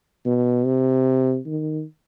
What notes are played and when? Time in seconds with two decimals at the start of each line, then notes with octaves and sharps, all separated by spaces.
0.26 B2
0.65 C3
1.46 D#3